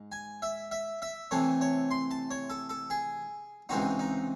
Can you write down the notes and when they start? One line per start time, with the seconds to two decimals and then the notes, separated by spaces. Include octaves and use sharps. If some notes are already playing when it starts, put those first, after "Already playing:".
Already playing: G#2
0.12 G#5
0.42 E5
0.71 E5
1.02 E5
1.31 C3 E3 A3 C#5
1.61 C#5
1.91 C6
2.11 A5
2.31 C#5
2.50 A4
2.69 A4
2.90 G#4
3.69 C#2 C3 E3 C4 D#4 F#4
3.99 D#4